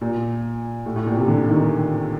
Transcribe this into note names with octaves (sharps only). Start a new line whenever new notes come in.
A#2
A2
A2
A#2
C3
D3
D#3